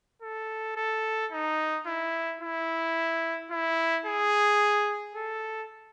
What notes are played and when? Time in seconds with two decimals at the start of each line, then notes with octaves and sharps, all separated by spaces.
0.22 A4
0.77 A4
1.32 D#4
1.87 E4
2.41 E4
3.51 E4
4.06 G#4
5.16 A4